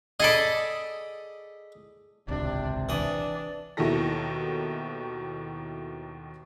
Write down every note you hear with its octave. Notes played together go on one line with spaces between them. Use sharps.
G#4 A4 D5 D#5 B5
D#1 G#1 C#2 C3 D4
E3 D4 D#6
D#2 B2 D#3 E4 A4 A#6